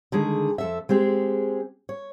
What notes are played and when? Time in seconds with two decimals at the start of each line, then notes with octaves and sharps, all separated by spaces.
0.12 D3 D#3 G#3 G#4
0.58 F2 A4 E5
0.89 G#3 C4 G4 G#4
1.89 C#5